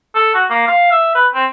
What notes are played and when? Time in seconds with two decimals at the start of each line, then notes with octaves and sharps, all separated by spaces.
0.15 A4
0.34 F#4
0.50 A#3
0.68 F5
0.92 E5
1.15 B4
1.34 C4